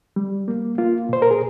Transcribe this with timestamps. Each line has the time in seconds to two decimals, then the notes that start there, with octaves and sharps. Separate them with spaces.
0.16 G3
0.48 A#3
0.78 A#3 F4
1.09 A#2 C5
1.22 A#4
1.31 G#4